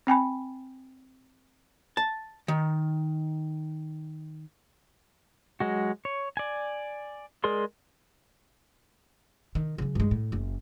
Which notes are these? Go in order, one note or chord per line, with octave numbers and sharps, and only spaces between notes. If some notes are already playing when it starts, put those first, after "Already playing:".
C4 G5 G#5 B5
A5
D#3
F#3 G#3 F#4
C#5
D5 G#5
G#3 G#4 A#4 D5 C6
D#3
C#3 F#3
G2 G#3
A2
F#1